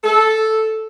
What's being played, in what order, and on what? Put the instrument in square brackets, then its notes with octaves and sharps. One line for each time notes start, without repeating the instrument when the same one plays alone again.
[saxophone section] A4